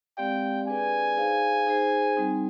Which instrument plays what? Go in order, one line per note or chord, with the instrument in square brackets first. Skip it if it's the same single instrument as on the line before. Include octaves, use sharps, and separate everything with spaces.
[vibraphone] G#3 C4 G4 D5 F5 [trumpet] G5
[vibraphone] D4 G#4 B4 D5 [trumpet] G#5
[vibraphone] D#4 G#4 C5 F5
D#4 G#4 C5
G3 C4 D#4